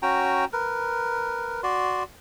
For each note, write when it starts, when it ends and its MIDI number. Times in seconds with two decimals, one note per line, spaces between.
0.02 0.45 61
0.02 0.45 66
0.02 0.45 79
0.02 0.45 82
0.53 1.61 70
0.53 1.61 71
1.63 2.03 66
1.63 2.03 74
1.63 2.03 84